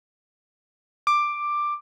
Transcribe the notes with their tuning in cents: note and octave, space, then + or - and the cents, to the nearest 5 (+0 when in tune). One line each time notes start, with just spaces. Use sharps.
D6 +10